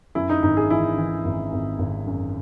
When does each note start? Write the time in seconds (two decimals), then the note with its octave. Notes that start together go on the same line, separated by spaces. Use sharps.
0.15 F#2 E4
0.29 D#4
0.43 G#1 D#4
0.57 G#4
0.70 E3 E4
0.97 E3
1.25 G#1
1.52 G#1
1.79 G#1
2.07 F#2